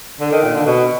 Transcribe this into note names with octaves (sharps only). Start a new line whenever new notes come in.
D3
D#3
A#2
D3
B2